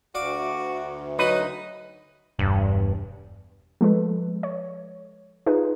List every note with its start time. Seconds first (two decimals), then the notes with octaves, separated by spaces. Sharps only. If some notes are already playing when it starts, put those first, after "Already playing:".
0.15 D2 F#4 D5 F5 D6
1.19 F#3 D#4 F#4 B4 D#5
2.39 E1 G2
3.81 F3 G#3 A4 B4
4.43 C#5
5.46 D#4 F4 G#4 B4